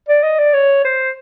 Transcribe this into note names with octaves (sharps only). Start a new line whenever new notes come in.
D5
D#5
D5
C#5
C5